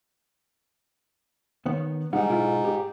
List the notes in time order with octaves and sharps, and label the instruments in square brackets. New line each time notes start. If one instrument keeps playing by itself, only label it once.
[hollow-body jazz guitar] D#3 B3 C#5
[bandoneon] G#2 [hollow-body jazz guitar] G3 D#4 F#5
[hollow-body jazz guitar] B1 E4 F4
G4